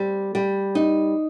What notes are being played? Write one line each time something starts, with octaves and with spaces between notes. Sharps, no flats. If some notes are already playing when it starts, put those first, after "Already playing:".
Already playing: G3 C4
G3
D#4